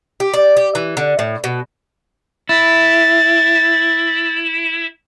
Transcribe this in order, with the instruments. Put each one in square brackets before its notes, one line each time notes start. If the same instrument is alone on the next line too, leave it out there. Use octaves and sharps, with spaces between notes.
[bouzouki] G4
D5
G4
E3
D3
A2
B2
[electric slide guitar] E4 [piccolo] A6